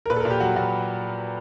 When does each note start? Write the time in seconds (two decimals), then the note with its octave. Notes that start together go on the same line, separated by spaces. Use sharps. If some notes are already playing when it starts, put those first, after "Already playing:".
0.06 A#4
0.10 A#2 B4
0.16 A4
0.20 A#4
0.25 A#2
0.30 G4
0.40 F#3 F#4
0.56 A#2 F#4